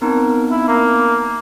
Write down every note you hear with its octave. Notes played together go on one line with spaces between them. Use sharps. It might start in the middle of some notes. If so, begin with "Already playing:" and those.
B3 C4 D#4 A#4
E4
A#3